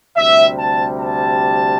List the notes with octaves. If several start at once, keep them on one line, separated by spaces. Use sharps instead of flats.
D2 C3 G3 E5
A5
A5